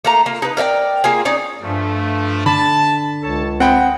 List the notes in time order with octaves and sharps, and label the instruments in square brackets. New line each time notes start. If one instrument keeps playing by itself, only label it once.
[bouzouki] A3 A#3 A#5
A#3 F4
D#4 B4
A#4 D5 E5 G5
A#3 F4 G#4
C#4 D#4 D5
[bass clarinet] G2 [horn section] F3 A3
[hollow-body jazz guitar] D3 [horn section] A5 [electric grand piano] B5
[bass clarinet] C#2 [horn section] A4 C#5 A5
[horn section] G#3 [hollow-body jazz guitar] C4 [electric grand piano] F#5 G5 B5